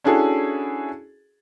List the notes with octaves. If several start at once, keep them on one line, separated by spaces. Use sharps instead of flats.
C#4 D4 E4 F#4 G#4 A4